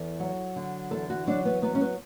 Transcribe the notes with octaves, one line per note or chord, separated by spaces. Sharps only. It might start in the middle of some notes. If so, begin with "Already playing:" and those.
Already playing: E2 A4
F#3
D3
E2 A4
F#4
F#3 D4
B3
F#3 B3
C#4
B3